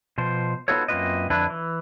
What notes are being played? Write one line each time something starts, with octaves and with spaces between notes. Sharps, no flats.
B2 F3 C5
B3 D#4 F4 F#4 A4 C#5
F#2 A#3 C4 F4 B4 D#5
F2 D3 D4 E4 B4
E3